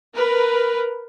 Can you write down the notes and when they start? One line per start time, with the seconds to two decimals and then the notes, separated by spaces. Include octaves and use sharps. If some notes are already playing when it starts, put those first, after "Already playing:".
0.14 A#4 B4